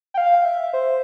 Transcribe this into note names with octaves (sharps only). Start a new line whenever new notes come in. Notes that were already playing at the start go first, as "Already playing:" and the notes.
G5
F5
E5
C5